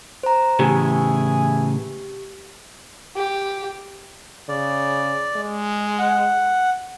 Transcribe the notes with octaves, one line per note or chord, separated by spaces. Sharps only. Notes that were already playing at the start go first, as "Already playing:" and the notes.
C5 A#5
A2 C#3 E3 G4 G#4 E5 G#5
G4
C#3 D5
G#3
F#5